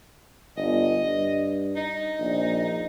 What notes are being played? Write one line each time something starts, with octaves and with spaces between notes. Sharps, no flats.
G1 D#5
G2
D#4
A#1